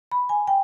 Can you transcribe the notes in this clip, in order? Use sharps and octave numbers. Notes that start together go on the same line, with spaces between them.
B5
G#5
G5